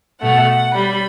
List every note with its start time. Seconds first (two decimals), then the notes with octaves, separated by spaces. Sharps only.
0.21 B2 A3 F#5
0.74 G3 B5